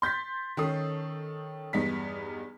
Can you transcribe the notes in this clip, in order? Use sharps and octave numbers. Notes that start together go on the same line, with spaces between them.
C6 G6 A6 B6
D#3 C#4 A4 D#6 C7
E2 G2 B3 D#4 B6